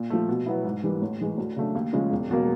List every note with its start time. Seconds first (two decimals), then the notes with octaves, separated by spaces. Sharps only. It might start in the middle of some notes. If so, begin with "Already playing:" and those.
Already playing: A#2
0.10 F3 A3
0.29 B2
0.46 F#3 B3 E4
0.64 G#2
0.83 E3 G3 A#3
1.02 A1
1.19 G#2 E3 G#3
1.38 D2
1.56 C#3 F#3 A3 D4
1.75 D#2
1.93 C#3 F3 G#3 C#4
2.11 E1
2.30 E2 B2 F#3 A#3